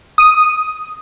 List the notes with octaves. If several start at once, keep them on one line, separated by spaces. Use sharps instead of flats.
D#6